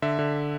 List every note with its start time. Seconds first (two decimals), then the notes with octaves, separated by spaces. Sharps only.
0.02 D3 E5
0.19 D3